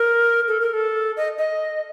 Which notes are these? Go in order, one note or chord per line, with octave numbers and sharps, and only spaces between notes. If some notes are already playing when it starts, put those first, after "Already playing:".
Already playing: A#4
A4
A#4
A4
D#5
D#5